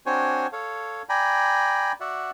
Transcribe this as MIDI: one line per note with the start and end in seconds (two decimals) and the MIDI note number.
0.06 0.47 60
0.06 0.47 62
0.06 0.47 66
0.06 0.47 72
0.06 0.47 73
0.06 0.47 80
0.53 1.02 69
0.53 1.02 73
0.53 1.02 77
1.09 1.92 74
1.09 1.92 79
1.09 1.92 80
1.09 1.92 82
1.09 1.92 83
2.00 2.31 66
2.00 2.31 74
2.00 2.31 76
2.00 2.31 78